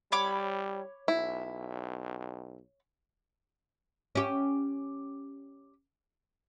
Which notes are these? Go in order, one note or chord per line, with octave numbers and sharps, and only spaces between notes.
G3 C#5 B5 D6
B1 E4
C#4 G4